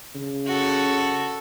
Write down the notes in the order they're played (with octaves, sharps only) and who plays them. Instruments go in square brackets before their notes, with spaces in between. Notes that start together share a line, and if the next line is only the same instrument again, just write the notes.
[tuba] C#3
[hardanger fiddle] F#4 A4